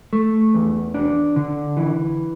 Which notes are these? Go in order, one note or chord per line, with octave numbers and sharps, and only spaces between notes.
A3
E2
D4
D3
E3